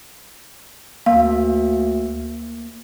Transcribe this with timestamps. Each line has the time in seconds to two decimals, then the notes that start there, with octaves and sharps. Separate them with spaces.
1.06 D2 A#3 F5